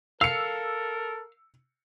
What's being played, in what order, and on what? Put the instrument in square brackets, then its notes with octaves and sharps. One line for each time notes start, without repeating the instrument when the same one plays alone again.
[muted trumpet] A4 [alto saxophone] A#4 [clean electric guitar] F5 [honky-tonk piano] E6 C#7